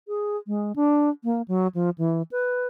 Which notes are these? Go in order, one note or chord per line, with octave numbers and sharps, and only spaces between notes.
G#4
G#3
D4
A#3
F#3
F3
E3
B4